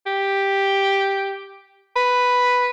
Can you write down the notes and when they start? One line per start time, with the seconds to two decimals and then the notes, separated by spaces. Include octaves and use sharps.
0.06 G4
1.96 B4